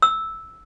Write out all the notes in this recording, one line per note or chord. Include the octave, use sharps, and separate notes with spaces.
E6